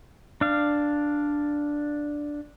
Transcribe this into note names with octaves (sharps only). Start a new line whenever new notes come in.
D4 F5